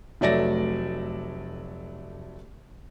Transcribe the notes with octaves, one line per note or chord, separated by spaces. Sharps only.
F1 F#3 A3 D5 E5 A#6